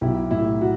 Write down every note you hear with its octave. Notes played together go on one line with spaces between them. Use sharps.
B1 E4 G4
A2 E4
F#4